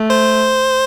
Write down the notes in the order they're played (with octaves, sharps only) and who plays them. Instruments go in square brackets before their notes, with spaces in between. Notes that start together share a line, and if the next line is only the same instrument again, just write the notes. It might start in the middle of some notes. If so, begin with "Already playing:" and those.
Already playing: [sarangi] A3
[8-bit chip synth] C5